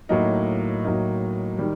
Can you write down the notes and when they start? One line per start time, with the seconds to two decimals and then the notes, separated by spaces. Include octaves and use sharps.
0.09 A2 F#3 A#3 D#4
0.84 A2 F#3 A#3 D#4
1.58 D#3 G3